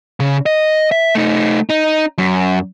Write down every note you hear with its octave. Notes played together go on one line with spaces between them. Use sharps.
C#3
D#5
E5
A3 D#4
D#4
F#2